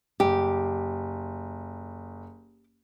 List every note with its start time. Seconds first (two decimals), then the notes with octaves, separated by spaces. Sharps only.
0.20 F#1 G4